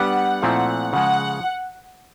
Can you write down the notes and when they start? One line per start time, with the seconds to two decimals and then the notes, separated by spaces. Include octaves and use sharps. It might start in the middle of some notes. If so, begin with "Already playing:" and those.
Already playing: G3 B3 D4 G4 B4 F#5
0.42 A#2 F3 A3 C4 E4 F#5
0.93 C#3 F3 G#3 F#5